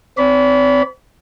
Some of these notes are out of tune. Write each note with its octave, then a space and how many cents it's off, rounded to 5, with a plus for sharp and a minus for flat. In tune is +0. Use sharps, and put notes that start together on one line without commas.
C4 -20 D5 -45 B5 +0